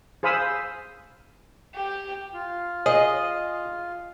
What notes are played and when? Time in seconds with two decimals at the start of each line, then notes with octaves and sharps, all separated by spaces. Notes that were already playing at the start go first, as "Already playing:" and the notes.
0.23 G#4 C5 F5 B5 D#6 E6
1.75 G4
2.34 F4
2.86 G#4 D#5